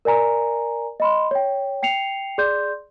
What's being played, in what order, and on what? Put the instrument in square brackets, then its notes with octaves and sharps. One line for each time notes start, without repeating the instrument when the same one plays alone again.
[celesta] A#4 D5 G#5 A#5
D#5 B5 C6
C#5 G5
G5 C7 C#7 F7
G#4 D5 C6 G6